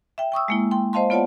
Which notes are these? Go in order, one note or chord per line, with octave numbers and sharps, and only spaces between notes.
E5 G5
G5 C#6 D#6 E6
G#3 A#3 E4
G5 C6
C5 D#5 F5 A5 C6
B3 F4 C#5 D5 F#5 A5